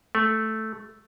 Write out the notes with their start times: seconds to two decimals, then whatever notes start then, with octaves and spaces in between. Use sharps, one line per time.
0.15 A3